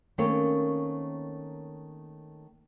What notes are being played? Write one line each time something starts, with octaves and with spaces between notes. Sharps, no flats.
D#3 A3 A#3 C4 C#4 C#5